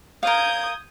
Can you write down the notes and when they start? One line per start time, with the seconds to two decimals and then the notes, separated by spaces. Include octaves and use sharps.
0.23 A#4 F5 D#6 G6 G#6